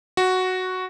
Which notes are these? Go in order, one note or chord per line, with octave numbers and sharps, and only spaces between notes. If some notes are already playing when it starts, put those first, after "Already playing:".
F#4